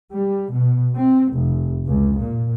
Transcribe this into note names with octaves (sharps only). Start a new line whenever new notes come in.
G3
B2
C4
F1
C#2
A#2